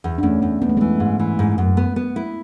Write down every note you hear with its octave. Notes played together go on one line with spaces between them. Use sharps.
E2
D4
E2 A3 C#4
E2 B3 D4
E2 B3
A3
E3 G#3 B3
G#2
E3
G#2
F#2
B3
B3
E4